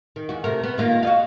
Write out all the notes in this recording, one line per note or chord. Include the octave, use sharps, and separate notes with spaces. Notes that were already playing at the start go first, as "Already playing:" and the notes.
D#3
E2 F#4
C3 A3 A#4
B3
D#3 A#3 F4
F#4 D#5 F5